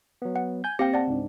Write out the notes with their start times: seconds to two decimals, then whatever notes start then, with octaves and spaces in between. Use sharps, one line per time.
0.22 F#3 B3
0.36 F#5
0.64 G#5 G6
0.79 A#3 C4 G4 F5 G5 A#6 C#7
0.94 D5 F#5 A5
1.07 C#2 G#2 D4